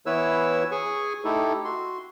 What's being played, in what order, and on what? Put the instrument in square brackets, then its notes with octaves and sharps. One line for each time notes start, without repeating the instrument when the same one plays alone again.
[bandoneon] E3 B3 E4 B4 C#5 E6
G#4 G#5 C#6
A3 D#4 E4 G4 A4
F#4 C6